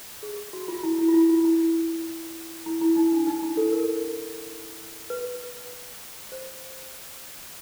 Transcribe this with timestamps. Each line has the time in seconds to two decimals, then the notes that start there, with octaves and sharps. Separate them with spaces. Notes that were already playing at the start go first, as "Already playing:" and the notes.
0.23 G#4
0.53 F#4
0.68 F4
0.83 E4
0.99 E4
1.08 F4
1.14 E4
1.29 F4
1.45 E4
2.66 E4
2.81 E4
2.96 D#4
3.12 D4
3.27 D#4
3.43 E4
3.57 A4
3.72 A#4
5.10 B4
6.32 C5